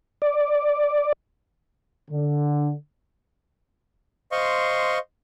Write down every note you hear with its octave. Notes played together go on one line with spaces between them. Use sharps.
D5
D3
C5 D#5 F5 C6 C#6